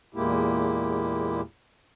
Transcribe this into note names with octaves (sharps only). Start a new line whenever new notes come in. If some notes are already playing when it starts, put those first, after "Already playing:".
E2 A#2 G#3 A#3 E4 G4